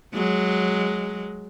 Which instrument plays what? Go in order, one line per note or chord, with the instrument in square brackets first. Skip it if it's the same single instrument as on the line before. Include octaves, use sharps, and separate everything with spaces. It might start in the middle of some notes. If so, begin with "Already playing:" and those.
[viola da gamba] F#3 G#3